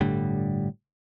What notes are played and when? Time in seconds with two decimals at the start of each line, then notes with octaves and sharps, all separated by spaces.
0.01 G1 A2 D3 G3